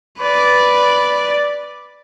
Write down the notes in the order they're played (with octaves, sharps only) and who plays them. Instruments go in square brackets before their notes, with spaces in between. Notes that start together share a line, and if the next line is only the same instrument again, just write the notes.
[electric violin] B4 D5